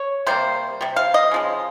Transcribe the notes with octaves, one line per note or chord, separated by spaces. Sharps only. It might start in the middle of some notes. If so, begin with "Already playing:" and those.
Already playing: C#5
C3 G3 A#3 C5
C3 G3
F5
D#5
C#3 F3 G#3